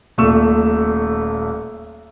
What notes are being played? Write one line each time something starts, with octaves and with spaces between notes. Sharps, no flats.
D#1 A#2 A3 C#6 E6 E7